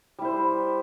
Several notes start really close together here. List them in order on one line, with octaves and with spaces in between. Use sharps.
G3 E4 C5